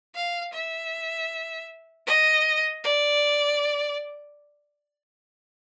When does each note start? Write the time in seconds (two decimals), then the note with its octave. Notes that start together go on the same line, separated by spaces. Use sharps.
0.15 F5
0.54 E5
2.06 D#5
2.83 D5